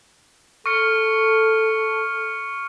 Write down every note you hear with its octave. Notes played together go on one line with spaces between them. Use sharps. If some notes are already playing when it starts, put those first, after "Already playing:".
A4 C#6 F6 C#7